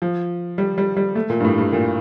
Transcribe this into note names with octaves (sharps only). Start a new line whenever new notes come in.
F3
G3
G3
G3
A3
A#2
G2
A2
G2
A#2